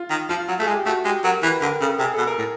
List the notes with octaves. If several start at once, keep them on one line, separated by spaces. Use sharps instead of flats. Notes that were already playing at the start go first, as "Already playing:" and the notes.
Already playing: F4
D#3
F3 F4
F#3
A3 G#4
G#3
G4
A3 F#4
G#3 G4
F#3 A#4
E3 B4
D3 A#4
C#3 A4
C3 G#4
B2 A4
A#4
A2